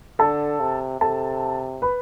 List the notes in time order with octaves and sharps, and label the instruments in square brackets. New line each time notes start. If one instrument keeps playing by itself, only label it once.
[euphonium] D3 [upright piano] A4 A5
[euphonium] C3
[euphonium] C3 [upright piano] A4 A5
[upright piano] B4 B5